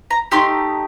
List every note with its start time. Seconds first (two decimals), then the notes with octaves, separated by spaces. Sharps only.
0.11 A#5
0.32 A3 D#4 G4 C6